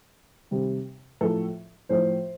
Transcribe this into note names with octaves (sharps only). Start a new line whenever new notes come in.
C3 D#3 G3
A2 F3 A4
A2 F3 C5